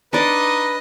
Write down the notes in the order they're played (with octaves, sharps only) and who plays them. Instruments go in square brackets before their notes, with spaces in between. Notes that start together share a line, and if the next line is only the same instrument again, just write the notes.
[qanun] D4 D5 [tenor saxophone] D#4 [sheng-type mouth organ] B4 [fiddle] D#5